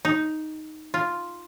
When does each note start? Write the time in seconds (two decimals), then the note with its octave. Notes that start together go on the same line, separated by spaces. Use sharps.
0.05 D#4
0.94 F4